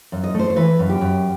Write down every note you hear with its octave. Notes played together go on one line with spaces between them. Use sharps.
F#2
D#5
A3
C5
C5
E3 B4
F#2
G4
F#2